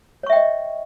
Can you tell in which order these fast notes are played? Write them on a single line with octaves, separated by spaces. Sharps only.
C#5 C#6 E5 G5 D#5